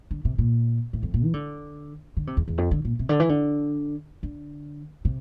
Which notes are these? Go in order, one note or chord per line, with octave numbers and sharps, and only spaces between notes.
D3
C3
A#2
A2
F2
A#2
E3
D3
D3
C3
E2
E2
F2
D3
A#2
C3
D3
E3
D3
D3
C3